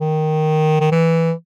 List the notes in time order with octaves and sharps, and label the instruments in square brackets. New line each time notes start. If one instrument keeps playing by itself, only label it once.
[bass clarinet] D#3
D#3
E3